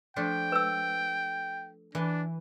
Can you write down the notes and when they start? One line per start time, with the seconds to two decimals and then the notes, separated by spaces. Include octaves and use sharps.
0.16 F3 A3 D4 G5
0.52 B4 E6
1.95 E3 D4